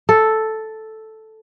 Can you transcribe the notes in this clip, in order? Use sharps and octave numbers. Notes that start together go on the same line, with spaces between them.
A4